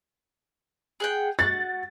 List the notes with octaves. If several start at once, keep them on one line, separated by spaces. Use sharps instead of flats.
G#4 F#5 G5
F#4 A6